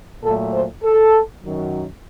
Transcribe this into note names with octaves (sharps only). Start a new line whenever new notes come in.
A#2 F#3 A3 A4
C5
A4
F#2 D#3 F#3